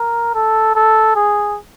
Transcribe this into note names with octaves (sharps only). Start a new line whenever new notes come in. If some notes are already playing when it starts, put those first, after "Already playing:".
Already playing: A#4
A4
A4
G#4